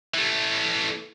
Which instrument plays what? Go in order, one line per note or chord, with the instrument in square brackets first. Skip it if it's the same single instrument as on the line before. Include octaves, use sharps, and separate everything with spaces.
[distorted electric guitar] E3 A3